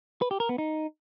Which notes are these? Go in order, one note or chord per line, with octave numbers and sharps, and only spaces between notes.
B4
G4
A#4
B3
D#4